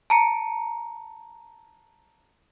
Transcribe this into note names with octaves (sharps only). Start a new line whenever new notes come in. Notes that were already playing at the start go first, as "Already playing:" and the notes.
A5 A#5 C#7